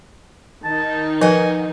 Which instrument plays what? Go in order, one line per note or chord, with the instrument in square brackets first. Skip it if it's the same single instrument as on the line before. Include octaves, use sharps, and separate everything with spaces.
[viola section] D#3 D#4 [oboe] A5
[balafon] F3 A#4 B4 [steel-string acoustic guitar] D#5 F#5 [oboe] G#5